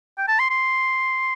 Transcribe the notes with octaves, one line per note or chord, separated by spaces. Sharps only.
G5
A5
C6
C6